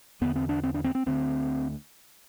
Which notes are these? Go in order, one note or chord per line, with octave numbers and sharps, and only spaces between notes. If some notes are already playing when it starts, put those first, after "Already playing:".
E2 D3 B3
C4
D4
C4
D4
C4
C4
D2 D3 C4